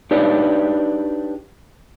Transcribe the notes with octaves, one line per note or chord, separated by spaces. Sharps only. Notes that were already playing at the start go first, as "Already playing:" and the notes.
D4 D#4 G4 B4 C#5 D5